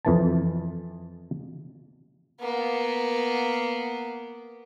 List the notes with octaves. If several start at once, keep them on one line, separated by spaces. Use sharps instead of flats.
F2 E3 A5
A#3 B3